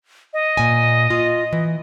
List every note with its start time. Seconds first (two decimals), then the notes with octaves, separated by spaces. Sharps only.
0.33 D#5
0.57 A#2 G#5
1.10 F4
1.53 E3